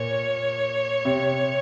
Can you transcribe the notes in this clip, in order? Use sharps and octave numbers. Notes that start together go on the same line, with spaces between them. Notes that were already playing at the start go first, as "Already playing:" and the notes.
Already playing: A#2 C#5
C3